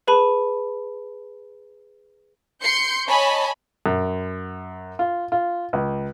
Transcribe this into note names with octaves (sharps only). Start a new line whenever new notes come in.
G#4 B4 A5 B5 D#7
C6 G6 C7 C#7
C#5 D#5 G#5 A5 B5
F#2
F4
F4
C#2